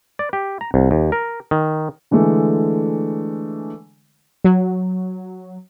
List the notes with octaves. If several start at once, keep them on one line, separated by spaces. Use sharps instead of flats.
D5
G4
A#5
C2
D#2
A#4
D#3
D3 E3 G#3 A3
F#3